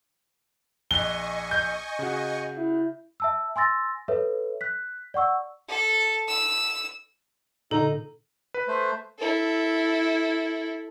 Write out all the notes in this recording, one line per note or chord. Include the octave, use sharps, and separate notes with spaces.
A#1 D#5 G#5 C#6 F#6 G7
G6
C#3 F#4
E4
E5 A5 E6
G#5 C6 E6 A6 A#6
A4 B4 C#5 E5
F#6 B6
D5 F#5 C#6 E6
A4
E6
A#2 D3 D#4 A4
B4
A3 C5
E4 A4